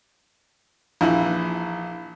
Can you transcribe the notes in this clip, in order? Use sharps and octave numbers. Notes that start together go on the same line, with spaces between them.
A#1 E3